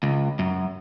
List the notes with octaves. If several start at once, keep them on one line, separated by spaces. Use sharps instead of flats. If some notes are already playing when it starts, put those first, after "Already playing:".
C#2
F#2